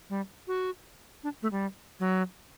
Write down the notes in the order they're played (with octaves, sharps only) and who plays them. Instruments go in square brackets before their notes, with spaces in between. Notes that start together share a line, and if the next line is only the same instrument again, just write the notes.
[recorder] G3
F#4
D4
A3
G3
F#3